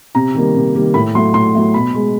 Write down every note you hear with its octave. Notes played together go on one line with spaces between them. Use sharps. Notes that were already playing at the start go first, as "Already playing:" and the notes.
C3 A#5
D#3 G3 A#3
C3
D#3 G3 A#3
A2 B5
F#3 A3 C6
A2 C6
F#3 A3
B2 B5
G#3